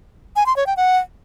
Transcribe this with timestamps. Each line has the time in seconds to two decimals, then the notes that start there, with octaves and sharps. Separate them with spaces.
0.36 G#5
0.46 C6
0.56 C#5
0.66 G5
0.77 F#5